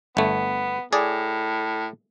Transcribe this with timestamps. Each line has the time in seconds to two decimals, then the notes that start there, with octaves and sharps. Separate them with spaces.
0.17 G1 A3 B3
0.93 A2 G#4 D5